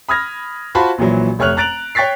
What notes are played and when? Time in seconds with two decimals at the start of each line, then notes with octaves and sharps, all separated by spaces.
0.09 B5 D#6 F6 G#6 A#6
0.75 F4 F#4 C5 A5 B5
0.98 A#1 A#2 E3 F#3
1.39 F1 A3 C#5 F6 F#6 F7
1.57 A#5 F#6 A6 D7 F7 F#7
1.95 C#5 G5 C#6 A6 B6 C7